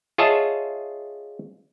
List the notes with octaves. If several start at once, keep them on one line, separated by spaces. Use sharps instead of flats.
F4 G#4 C#5 D#5 E5 A5